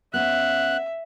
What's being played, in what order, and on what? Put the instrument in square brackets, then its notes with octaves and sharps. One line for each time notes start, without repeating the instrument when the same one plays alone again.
[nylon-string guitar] B3 C#4 [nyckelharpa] E5 [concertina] F#6